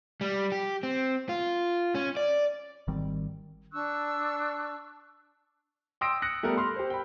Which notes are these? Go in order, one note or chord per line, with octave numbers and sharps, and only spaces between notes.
G3
G4
C4
F4
C#4
D5
G#1 D#3 G3 C4
D4 C#6 E6 F#6
G5 C6 D#6 E6 A#6 D7
D#6 F#6 A#6 C#7
G3 A3 B3 G4 A4 A#4
B5 C6 F6
G4 C5
G5 B5